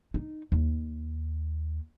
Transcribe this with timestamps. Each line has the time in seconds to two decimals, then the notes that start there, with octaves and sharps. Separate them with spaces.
0.14 D#4
0.52 D#2